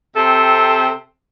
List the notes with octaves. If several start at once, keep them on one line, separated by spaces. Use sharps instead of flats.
C3 C4 A4